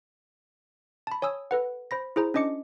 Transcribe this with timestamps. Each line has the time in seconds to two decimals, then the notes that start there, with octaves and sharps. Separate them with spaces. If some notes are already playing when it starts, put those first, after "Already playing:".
1.07 A5 B5
1.22 C#5 G#5 D#6 E6
1.51 A4 B4 F#5
1.91 C5 B5 A#6
2.16 E4 G#4 C5 A#5
2.34 C#4 D4 D#5 D6 C#7